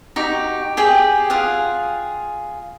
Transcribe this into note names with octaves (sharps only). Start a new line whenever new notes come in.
D#4 F#4 G4
G4 G#4 G5
F4 G#4 F5 F#5